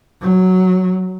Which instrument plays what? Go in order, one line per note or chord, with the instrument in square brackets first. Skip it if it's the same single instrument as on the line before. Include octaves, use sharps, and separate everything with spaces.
[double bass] F#3